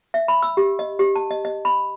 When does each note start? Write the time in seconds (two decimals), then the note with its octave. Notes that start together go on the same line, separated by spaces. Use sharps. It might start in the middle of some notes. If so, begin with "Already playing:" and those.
0.14 E5
0.28 B5
0.42 E6
0.57 G4
0.79 D#5
0.99 G4
1.16 A5
1.30 D#5
1.45 D#5
1.65 B5